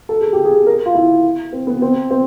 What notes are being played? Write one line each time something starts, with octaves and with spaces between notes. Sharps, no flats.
A4
G#4
G4
G#4
A#4
F4
E4
C4
B3
C4
C4